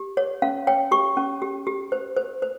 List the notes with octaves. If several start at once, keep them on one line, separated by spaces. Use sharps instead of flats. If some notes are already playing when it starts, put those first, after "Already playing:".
Already playing: G4
C#5
C#4 F5
C#5 G5
G4 C#6
C#4
G4
G4
C5
C5
C5